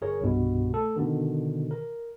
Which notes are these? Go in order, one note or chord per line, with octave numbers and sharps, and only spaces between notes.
G1 G#4 A#4 C#5
C2 G2 B2
A3 A4
B2 D3 D#3
A#4